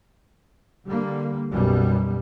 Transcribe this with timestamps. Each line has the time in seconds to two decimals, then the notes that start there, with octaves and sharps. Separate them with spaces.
0.87 D3 G3 A#3
1.50 B1 F#2 B2 G3